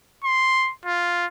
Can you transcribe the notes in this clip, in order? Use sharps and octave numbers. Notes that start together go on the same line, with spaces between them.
C6
F4